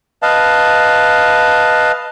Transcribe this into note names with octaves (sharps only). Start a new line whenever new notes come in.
B4 D#5 F5 A5